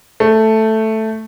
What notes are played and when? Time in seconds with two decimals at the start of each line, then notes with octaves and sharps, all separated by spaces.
0.20 A3